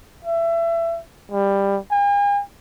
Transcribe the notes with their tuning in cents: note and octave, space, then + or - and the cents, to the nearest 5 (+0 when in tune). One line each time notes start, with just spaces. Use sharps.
E5 +25
G3 +15
G#5 -45